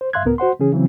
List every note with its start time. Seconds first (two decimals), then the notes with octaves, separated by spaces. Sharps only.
0.01 C5
0.13 G2 E5 F5 C6 F#6 G#6
0.25 C#2 A2 B3 A#4
0.38 F#4 C5 F#5 C6
0.60 C#3 E3 C#4 G#4
0.72 C#3 E3 F#3 C4